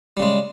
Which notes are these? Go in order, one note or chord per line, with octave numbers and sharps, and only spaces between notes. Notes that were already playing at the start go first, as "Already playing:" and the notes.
C#3 G3 G#3